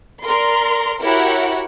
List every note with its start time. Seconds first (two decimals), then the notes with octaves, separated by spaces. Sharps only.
0.22 A#4 D5 C6
1.02 E4 F#4 G4 A#4 C#5 F#5